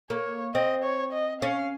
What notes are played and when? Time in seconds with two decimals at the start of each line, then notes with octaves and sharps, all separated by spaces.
0.10 A#3 C#5
0.54 C4 D#5
0.84 C#5
1.13 D#5
1.42 C#4 F5